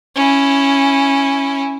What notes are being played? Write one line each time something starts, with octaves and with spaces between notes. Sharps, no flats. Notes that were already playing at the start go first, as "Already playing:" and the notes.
C#4 E4